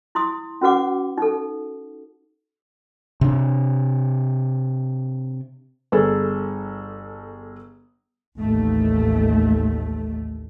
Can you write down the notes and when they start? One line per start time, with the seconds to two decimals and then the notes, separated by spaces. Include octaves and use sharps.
0.15 E4 C6 D#6
0.61 C#4 F#4 B4 F#5 D6
1.18 D#4 A4
3.21 C3 D4
5.92 G1 G#4 A4
8.39 A1 D#2 A3